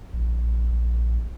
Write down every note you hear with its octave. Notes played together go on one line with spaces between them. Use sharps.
A#1